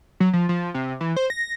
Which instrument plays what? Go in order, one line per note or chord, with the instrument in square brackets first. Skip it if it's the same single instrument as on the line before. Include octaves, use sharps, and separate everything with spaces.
[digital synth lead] F#3
F3
F3
C3
E3
C5
A#6